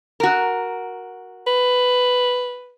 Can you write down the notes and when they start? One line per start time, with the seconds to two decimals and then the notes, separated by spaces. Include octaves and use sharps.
0.20 F#4 A#4
1.47 B4